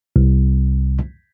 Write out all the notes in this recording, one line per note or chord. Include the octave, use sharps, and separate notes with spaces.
C2